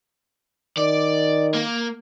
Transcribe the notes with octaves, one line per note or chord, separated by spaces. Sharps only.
D#3 D5
A#3